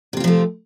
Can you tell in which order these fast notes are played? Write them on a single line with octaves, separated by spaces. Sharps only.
C3 C4 F4 F3 A3